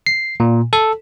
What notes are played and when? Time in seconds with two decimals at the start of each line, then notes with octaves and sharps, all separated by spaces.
0.07 C7
0.40 A#2
0.73 A4